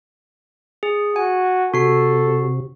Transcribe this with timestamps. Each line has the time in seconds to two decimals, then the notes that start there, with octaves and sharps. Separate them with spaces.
0.83 G#4
1.16 F#4 G#5
1.74 C3 F#4 A4 C7